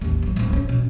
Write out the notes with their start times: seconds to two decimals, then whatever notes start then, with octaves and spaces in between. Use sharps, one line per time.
0.01 A1 D#2
0.23 D#3 F#3
0.36 D1 F3
0.53 C#4
0.69 B2